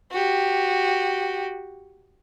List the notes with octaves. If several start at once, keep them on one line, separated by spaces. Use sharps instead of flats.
F#4 G4